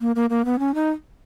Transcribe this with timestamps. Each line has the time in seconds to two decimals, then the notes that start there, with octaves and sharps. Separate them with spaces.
0.01 A#3
0.16 A#3
0.30 A#3
0.45 B3
0.59 C#4
0.75 D#4